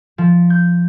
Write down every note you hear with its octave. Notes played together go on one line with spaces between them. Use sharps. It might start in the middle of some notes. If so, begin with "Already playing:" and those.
F3
G6